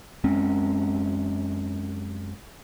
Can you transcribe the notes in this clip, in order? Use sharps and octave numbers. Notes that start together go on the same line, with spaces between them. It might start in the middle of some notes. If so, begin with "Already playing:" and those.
F#2 G#3 C4 C#4